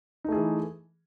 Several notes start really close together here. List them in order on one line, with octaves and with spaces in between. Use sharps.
D#4 A3 G#4 E3